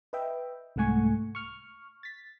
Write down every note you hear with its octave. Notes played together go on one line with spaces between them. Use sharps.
B4 D#5 E5 G5
C2 G#2 A3 F#5 G#5 C#6
C#6 F6
A6 B6